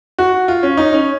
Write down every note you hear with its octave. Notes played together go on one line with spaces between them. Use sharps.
F#4
F4
C#4
D#4
C#4